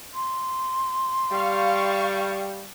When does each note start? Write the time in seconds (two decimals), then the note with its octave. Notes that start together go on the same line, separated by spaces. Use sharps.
0.15 C6
1.31 G3 F5 C#6